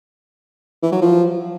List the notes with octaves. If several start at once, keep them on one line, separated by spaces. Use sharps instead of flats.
E3
F#3
F3